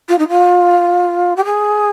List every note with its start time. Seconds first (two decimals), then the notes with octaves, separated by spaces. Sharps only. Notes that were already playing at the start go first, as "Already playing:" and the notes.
0.08 F4
0.18 D#4
0.28 F4
1.36 G4
1.44 G#4